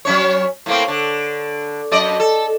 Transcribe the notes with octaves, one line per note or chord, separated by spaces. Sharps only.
F#3 C#4 C#5
A2 A#3 C4
D3
F#2 D5 D#5
A4